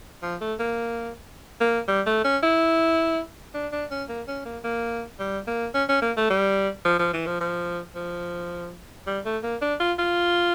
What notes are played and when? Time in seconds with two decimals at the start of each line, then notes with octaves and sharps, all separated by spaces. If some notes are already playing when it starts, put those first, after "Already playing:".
0.22 F3
0.41 A3
0.59 A#3
1.60 A#3
1.88 G3
2.06 A3
2.24 C#4
2.43 E4
3.54 D4
3.72 D4
3.91 C#4
4.09 A#3
4.28 C#4
4.45 A#3
4.64 A#3
5.19 G3
5.47 A#3
5.74 C#4
5.89 C#4
6.02 A#3
6.17 A3
6.30 G3
6.85 F3
6.99 F3
7.13 E3
7.26 F3
7.40 F3
7.95 F3
9.06 G3
9.25 A3
9.43 A#3
9.61 D4
9.80 F4
9.99 F4